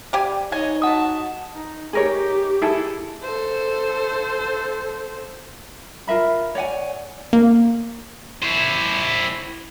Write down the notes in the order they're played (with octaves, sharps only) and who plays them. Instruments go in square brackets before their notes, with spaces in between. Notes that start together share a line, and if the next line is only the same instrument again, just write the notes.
[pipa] G3 G4 G#5 [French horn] D5
[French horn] D#4 [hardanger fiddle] C#5 D#5 [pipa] G#5
[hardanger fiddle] F#4 A5 [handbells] F#5 D#6
[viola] D#4
[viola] D#4 G4 [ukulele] G#4 A#4 C#5
[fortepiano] E4 G#4 A4
[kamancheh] A4 C5
[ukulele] F4 A#4 E5 B5
C#5 D5 F#5 G#5
[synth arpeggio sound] A#3
[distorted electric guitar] E4 C5